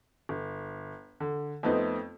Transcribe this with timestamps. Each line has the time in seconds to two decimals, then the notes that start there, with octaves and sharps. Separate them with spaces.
0.29 G1
1.20 D3
1.63 F2 A3 B3 C4 D#4